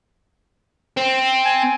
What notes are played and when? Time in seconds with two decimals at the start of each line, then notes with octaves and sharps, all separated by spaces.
0.97 C4
1.45 G#5